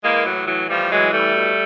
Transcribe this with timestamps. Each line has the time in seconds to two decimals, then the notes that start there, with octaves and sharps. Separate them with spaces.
0.03 E3 G#3 A#3
0.25 A2 F#3
0.47 E3 F#3
0.69 A2 F3 G3
0.90 E3 F#3 G#3
1.12 A2 G3 A3
1.34 B2